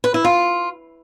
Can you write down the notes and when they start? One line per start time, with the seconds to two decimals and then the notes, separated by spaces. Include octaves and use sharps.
0.04 B4
0.14 E4
0.24 F4